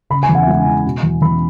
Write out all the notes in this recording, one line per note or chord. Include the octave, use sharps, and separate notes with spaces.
C#3 B5
G#5
E2
F#5
E5
G#3 F#5
E3
B2
E2
E2 B5